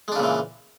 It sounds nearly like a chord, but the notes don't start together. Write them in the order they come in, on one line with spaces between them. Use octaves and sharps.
G#3 D4 C#3 A#2 E3